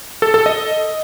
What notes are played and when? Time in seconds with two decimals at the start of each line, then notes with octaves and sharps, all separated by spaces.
0.22 A4
0.34 A4
0.46 D#5